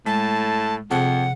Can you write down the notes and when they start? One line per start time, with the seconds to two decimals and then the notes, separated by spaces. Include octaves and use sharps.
0.06 A2 G#3 A5
0.91 F2 C3 G#4 F#5 A5